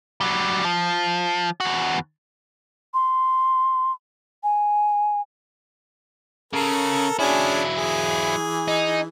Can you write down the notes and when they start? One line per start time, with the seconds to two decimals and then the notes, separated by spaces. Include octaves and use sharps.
0.21 F#3 G3
0.64 F3
1.60 E2 F#4
2.94 C6
4.43 G#5
6.53 C#3 A4 A#4
7.19 F#3 C#4 D4 E4 G#4
7.76 E3 G#4
8.68 D#4